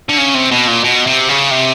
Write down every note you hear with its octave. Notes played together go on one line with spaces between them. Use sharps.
D3
C#3
C3
B2
A#2
B2
C3
C#3
C3